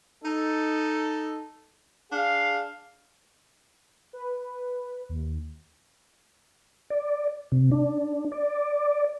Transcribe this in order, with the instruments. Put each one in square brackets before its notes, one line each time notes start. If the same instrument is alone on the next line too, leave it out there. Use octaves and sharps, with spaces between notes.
[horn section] D#4 A4
D4 G#4 F5
[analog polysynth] B4
D#2
[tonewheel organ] D5
C3
D4
D5